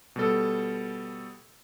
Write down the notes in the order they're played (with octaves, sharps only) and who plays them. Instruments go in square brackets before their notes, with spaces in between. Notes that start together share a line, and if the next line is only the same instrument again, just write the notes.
[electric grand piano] B2 G3 A4